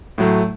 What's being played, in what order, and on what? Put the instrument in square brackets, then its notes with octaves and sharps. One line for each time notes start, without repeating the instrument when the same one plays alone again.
[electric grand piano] A2 F#3 A3